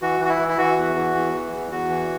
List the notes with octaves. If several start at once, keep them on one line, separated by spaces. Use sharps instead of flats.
E3 F#4
E3 F#4
E4
E3
E4
E3 F#4
E2
E3
E2
E3
E2
E2 F#4
E3